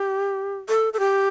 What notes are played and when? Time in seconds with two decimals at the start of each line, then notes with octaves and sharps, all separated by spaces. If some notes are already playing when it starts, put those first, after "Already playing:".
Already playing: G4
0.69 A4
0.93 A4
0.99 G4